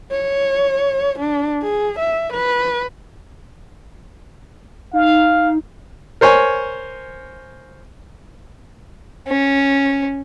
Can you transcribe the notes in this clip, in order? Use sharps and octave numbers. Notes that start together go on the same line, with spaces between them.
C#5
D4
G#4
E5
B4
D#4 F5
A#4 C5 C#5 G#5
C#4